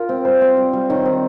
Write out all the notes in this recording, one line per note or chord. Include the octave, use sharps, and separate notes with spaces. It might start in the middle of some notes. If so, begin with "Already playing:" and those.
Already playing: F4 A#4
C4
G3 C5
C4
G3
G3
D#3 C#5
C4